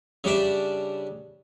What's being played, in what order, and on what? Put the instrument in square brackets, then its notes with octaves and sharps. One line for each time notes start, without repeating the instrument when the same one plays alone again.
[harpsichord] C#3 G3 D4 D5 E5